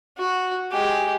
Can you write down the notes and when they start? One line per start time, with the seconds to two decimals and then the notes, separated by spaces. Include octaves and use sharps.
0.18 F#4
0.72 G#3 G4